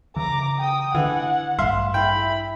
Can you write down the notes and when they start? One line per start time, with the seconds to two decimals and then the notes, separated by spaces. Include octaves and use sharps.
0.16 C#3 E3 A#5 D6
0.58 G5 D#6
0.95 D3 E3 F#5
1.59 A1 G2 E5 F5 C6
1.94 E4 G5 B5